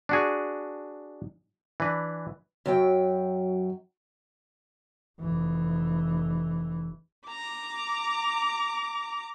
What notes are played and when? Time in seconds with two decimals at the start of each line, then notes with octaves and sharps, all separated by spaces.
0.09 D4 F#4 G#4
1.80 E3 D4 B4
2.66 F#2 F#3 G5
5.20 F1 E3
7.28 A#5 D6